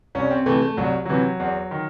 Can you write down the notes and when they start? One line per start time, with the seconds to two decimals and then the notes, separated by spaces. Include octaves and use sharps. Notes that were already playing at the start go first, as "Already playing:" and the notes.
0.15 C2 C#4
0.30 C4
0.46 C3 E3 A3
0.62 A3
0.77 C2 F#3
1.05 C3 E3 F#3
1.40 E2
1.71 D#3